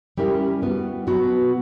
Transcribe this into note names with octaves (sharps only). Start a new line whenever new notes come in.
G3 C#4 E4 G4 A#4
G3 B3 F#4
B2 F#3 B3 F#4